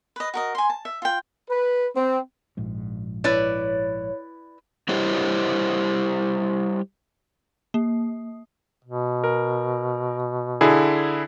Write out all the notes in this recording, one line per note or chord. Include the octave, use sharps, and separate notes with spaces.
B4 D#5
F#4 A#4 D#5
G#5 C6
A5
E5
F4 G5
B4
C4
A#1 G#2
E4 B4 C#5 D5
G3 E4 G4 C5 C#5 D#5
A#3
B2
A#4
D3 E4 G#4